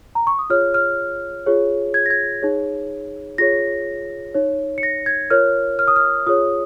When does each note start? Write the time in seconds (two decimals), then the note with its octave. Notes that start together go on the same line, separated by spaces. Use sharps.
0.15 A#5
0.27 C#6
0.39 D#6
0.50 F4 G#4 C#5 F6
0.74 F6
1.46 F4 G#4 C#5
1.94 G#6
2.06 A#6
2.10 G#6
2.42 D#4 G#4 C#5
3.38 F4 G#4 C#5 A#6
4.34 D#4 C#5
4.78 C#7
4.83 A#6
5.06 G#6
5.30 F4 A#4 C#5 F6
5.79 F6
5.88 D#6
5.96 F6
6.27 F4 G#4 C#5 D#6